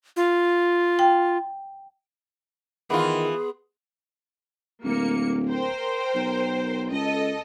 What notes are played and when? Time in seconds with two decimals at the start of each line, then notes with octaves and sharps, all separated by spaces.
0.16 F4
0.99 G5
2.90 D#3 E3 B3 F4 G#4 C6
4.84 D1 A#3 C#7
5.49 A#4 C5 G5
6.15 B1
6.91 C#2 A4 D#5